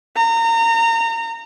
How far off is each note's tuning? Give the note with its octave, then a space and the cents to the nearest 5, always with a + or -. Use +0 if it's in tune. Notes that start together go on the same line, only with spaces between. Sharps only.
A#5 -30